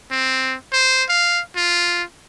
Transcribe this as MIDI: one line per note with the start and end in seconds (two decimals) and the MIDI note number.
0.11 0.57 60
0.72 1.04 72
1.09 1.41 77
1.56 2.03 65